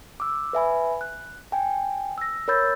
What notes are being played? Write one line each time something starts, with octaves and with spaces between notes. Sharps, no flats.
D6 E6
B4 E5 G#5 B5
F#6
G5 G#5
E6 A#6
A#4 C#5 B5 E6 G6 A6